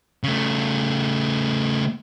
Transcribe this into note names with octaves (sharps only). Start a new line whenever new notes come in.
C#3 A3